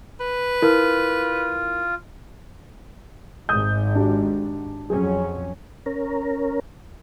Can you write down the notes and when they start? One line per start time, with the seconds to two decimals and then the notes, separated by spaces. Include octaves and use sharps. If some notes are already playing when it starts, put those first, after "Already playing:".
0.20 B4
0.62 E4 F4 A#4
3.49 G#1 G#2 D#6 G6
3.95 D4 F#4 G4
4.90 F2 F#3 C#4 G#4
5.86 C#4 A#4